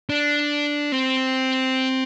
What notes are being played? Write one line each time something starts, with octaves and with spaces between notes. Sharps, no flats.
D4
C4